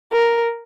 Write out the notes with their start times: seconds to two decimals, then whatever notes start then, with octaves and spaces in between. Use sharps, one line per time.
0.12 A#4